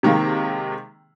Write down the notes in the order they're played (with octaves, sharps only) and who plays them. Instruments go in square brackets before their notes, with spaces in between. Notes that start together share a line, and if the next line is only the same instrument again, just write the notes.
[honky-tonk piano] C3 D#3 G#3 A#3